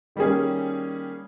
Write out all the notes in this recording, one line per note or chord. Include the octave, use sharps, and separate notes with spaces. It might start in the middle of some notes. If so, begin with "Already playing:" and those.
D#3 G3 A#3 C#4 G#4